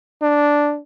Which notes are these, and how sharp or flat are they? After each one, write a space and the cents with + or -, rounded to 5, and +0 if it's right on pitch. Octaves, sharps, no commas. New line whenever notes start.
D4 -5